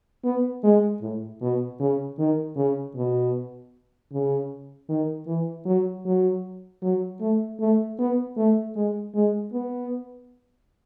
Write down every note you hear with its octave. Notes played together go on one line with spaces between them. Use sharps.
B3
G#3
A2
B2
C#3
D#3
C#3
B2
C#3
D#3
E3
F#3
F#3
F#3
A3
A3
B3
A3
G#3
G#3
B3